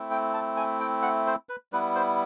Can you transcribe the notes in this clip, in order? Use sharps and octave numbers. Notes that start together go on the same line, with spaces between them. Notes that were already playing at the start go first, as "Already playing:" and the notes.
Already playing: A3 C4 E4
G5
A5
G#5
G5
F#5
C5
B4
G3 B3 E4 B4
C5